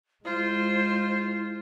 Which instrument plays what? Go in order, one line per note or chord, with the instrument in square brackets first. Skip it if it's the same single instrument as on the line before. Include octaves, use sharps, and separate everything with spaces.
[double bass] G#3 [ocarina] E4 [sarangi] F4 [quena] C5